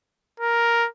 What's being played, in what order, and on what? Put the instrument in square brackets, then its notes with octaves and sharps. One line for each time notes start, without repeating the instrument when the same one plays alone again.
[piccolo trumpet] A#4